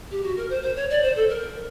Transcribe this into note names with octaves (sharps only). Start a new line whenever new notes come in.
G4
F#4
A#4
C5
C5
C#5
D5
C5
A4
A#4